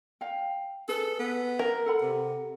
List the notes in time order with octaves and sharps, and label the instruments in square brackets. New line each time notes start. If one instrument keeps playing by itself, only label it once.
[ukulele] F5 G5
[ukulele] G#4 B4 [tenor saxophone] A4
[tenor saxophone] B3
[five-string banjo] A#4
[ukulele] A4 F#5 B5
[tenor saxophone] C3